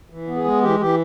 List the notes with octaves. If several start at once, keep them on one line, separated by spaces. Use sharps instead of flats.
E3
B3
G#4
G#3
E3 G4
E3 G4